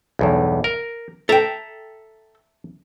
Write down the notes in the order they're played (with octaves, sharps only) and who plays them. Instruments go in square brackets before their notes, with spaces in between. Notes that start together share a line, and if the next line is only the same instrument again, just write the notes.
[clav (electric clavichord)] B1 E2 G2
A#4
[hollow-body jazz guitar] A4 G5 [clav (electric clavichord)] E5 A5 A#5